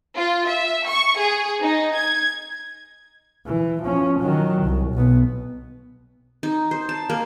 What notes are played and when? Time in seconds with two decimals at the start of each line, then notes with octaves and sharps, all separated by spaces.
0.17 F4
0.48 E5
0.87 C#6
1.19 G#4
1.62 D#4
1.95 G#6
3.47 E3
3.83 F3 C#4
4.20 D#3 F#3
4.62 C2
4.93 B1 B3
6.43 D#4
6.71 C5
6.89 A5
7.10 A#3